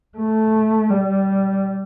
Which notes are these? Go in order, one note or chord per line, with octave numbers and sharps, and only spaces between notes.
A3
G3